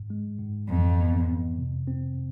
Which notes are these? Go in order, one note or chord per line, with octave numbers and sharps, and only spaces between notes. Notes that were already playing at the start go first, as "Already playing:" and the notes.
Already playing: G#2
G#3
G#2
F2 E3
B3
F2
C3
C4